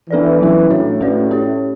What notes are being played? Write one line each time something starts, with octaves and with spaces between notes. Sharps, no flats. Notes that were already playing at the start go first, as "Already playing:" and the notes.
E3 B3 D4 A4 D5
F#3 C#4 E4
A2 A3 D4 F#4 C#5
A3 C#4 F#4 B4 D5
C#4 G4 C#5